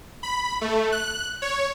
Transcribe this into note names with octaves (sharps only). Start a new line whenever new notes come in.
B5
A3
F#6
C#5